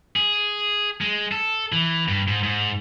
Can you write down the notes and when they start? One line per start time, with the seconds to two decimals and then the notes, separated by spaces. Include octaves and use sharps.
0.16 G#4
1.01 G#3
1.32 A4
1.72 E3
2.08 G2
2.28 G#2
2.43 G#2